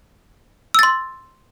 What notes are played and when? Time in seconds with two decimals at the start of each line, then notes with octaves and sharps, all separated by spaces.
0.74 E6
0.79 A6
0.83 C6